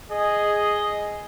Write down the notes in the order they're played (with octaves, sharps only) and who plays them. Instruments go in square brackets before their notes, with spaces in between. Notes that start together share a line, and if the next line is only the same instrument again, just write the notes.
[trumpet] G#4 [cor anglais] D#5